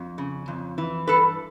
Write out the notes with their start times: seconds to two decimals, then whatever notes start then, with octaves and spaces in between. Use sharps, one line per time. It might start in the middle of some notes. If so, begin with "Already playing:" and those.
Already playing: F2
0.18 C#3
0.48 F2
0.78 E3
1.07 G2 A4 B4